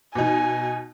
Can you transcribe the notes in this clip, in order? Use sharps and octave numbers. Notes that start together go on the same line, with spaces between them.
B2 D#4 G#5